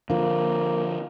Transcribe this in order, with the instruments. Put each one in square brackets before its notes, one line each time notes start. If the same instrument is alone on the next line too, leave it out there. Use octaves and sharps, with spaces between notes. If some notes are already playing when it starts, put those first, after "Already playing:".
[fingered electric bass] D3 F3 [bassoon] A#3